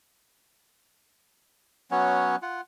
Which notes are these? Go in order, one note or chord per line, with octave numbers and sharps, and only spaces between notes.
F#3 B3 C#4 C#5
F4 F#5